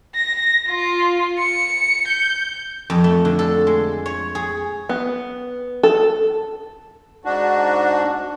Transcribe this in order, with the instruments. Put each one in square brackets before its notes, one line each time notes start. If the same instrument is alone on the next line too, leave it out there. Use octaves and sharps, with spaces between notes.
[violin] A#6
F4
C#7
G6
[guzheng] F2
A3
D3
A4
G#3
C#5
G#4
[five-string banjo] B3
A4
[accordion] G#2 D4 F#4